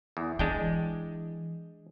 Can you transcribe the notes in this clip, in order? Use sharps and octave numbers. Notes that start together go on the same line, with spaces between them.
E2
E3 G#3 D4 G5